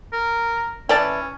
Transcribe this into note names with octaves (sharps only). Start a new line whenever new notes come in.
A#4
E3 C#4 D5 A5